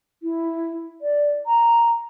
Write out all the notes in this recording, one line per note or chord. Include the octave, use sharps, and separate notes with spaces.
E4
D5
A#5